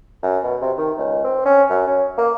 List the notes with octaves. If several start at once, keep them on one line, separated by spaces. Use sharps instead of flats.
F#2
B2
C3
D#3
C#2
C4
C#4
F#2
C#4
A#3